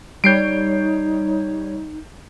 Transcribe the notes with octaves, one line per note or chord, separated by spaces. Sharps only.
G3 D#4 C#5 G6 C7 D7